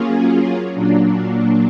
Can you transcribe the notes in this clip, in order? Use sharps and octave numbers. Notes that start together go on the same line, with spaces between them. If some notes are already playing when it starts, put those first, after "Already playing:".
Already playing: F#3 A#3 C#4 F4 G#4
A#2 F#3 A#3 D4